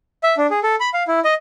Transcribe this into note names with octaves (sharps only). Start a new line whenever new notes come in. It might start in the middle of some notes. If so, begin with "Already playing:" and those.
E5
D4
G#4
A4
B5
F5
E4
D#5